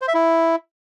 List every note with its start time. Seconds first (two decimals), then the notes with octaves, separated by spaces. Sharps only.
0.02 C5
0.08 E5
0.14 E4